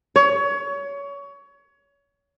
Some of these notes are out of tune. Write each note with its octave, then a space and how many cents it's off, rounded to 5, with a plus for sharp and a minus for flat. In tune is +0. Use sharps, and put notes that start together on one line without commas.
C#5 +25